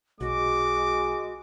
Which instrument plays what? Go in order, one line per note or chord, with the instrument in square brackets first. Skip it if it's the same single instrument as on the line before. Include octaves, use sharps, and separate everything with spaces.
[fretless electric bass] B1 [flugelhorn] G#3 [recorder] F#4 [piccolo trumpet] D6